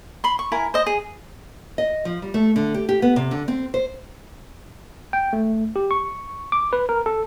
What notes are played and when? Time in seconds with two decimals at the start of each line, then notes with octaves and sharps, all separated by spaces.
0.24 B5 C6
0.39 C#6
0.52 E4 A#4 G#5
0.74 C5 D#5
0.86 G#4
1.78 D#5
2.05 F3
2.22 G3
2.34 A3
2.56 D3
2.74 G4
2.89 G4
3.02 B3
3.16 C3
3.31 D3
3.48 C4
3.74 C5
5.13 G5
5.33 A3
5.76 G4
5.91 C#6
6.52 D6
6.73 B4
6.89 A#4
7.06 A4